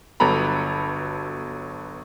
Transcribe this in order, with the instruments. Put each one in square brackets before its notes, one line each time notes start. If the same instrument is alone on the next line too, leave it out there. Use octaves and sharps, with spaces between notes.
[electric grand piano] G1 F#3 B3 A4 A#5 B5